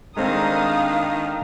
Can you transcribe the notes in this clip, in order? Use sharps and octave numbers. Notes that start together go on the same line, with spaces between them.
D#3 G#3 C4 D4 A4 F5 A#5 D#6